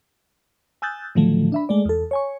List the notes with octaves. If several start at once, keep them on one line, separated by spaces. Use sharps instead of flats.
G#5 D#6 E6 F#6 G6 A6
A2 D3 D#3 F3 F#3 A3
D4 E5 B5
G#3 A3 D5
E2 A4
C#5 G#5 C#6